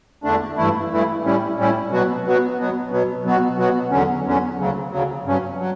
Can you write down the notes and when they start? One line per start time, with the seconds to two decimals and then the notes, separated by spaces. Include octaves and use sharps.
0.24 E2 D3 A3 D4
0.57 G2 E3 A3 E4
0.91 G2 E3 A3 E4
1.24 A2 G3 C#4 E4
1.58 A2 G3 C#4 E4
1.91 B2 F#3 B3 F#4
2.24 B2 F#3 B3 F#4
2.58 B2 F#3 B3
2.91 B2 F#3 B3
3.25 B2 F#3 B3 F#4
3.58 B2 F#3 B3 F#4
3.91 E2 D3 F#3 C#4
4.25 E2 D3 F#3 C#4
4.58 D2 C#3 F#3
4.91 D2 C#3 F#3
5.25 G2 F#3 C#4
5.60 F#3